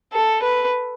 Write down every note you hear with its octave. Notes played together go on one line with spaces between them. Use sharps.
A4
B4